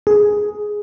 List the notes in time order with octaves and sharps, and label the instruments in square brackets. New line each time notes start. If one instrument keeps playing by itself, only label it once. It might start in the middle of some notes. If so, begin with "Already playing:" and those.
[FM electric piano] G#4